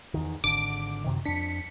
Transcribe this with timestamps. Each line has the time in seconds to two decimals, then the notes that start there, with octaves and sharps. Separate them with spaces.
0.14 E2 D#3
0.44 G#1 D3 D6
1.04 F#2 C3 D#3
1.25 F2 D4 B6 C#7